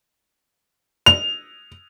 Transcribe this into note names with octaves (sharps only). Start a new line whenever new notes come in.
F7